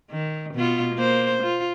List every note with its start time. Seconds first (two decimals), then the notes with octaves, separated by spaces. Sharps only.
0.11 D#3
0.54 B2 B3 F4
0.94 A#3 C5
1.43 F4